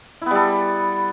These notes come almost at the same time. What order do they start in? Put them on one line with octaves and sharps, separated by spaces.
E4 B3 G3 A4